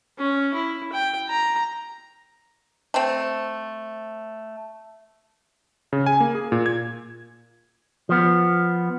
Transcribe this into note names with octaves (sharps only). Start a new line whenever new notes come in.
C#4
E4
G5
A#5
A3 C4
C#3
G#5
A#3
G#4
A#2
G#6
F3 B3